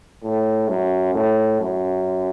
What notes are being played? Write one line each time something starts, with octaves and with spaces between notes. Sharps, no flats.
A2
F#2
A2
F#2